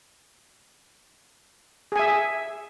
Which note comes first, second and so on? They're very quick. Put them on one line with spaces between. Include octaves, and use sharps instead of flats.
G#4 G#5 E5